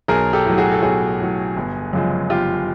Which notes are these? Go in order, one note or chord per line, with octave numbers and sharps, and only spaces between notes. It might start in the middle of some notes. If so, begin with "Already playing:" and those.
B1 G#4 A#4
G4 A4
A2 F#3
F#4 G#4
A4
B1 F#4 G#4
A2 F#3
G1
F#2 C#3 F3 G#3
G1 F4 G4